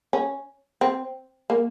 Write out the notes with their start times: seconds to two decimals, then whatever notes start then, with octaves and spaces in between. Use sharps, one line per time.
0.13 C#4
0.81 C4
1.50 A#3